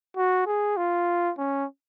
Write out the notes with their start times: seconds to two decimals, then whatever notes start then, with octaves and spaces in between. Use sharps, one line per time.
0.17 F#4
0.46 G#4
0.77 F4
1.38 C#4